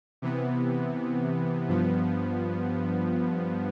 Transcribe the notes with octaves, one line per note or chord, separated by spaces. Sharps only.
C3 E3 B3
G2 F3 B3